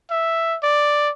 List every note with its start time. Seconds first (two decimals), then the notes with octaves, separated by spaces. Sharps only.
0.10 E5
0.63 D5